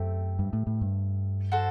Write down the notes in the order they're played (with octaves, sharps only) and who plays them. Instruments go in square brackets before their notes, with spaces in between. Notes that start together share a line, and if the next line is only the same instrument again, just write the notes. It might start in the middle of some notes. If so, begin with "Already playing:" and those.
Already playing: [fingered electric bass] F#2 [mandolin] A3 C4 G4
[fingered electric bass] G2
A2
A2
G2
[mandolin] F#4 A4 C5